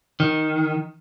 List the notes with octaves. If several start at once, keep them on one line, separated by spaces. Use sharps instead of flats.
D#3